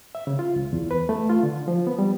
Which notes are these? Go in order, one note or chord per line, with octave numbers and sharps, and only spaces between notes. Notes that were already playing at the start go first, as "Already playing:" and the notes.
E5
C#3
F4
C#2
E2
B4
A3
F4
D3
F3
B3
G3